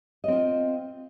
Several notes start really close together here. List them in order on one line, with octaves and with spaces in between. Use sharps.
D#5 C4 F4